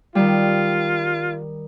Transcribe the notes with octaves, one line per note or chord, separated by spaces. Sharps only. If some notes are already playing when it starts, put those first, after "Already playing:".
D#3 G3 F4